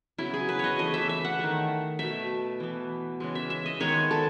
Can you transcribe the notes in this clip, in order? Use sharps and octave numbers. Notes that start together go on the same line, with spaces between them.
C#3 F#3 B3 E4
G#4
B4
C#5 D#5
E3 A3 D#5
E5
E5
F#5
D#3 A3
B2 A3 E5
E3 B3
C#3 E3 G#3
E5
E5
D#5
D#3 G#3 B3 C#5
A4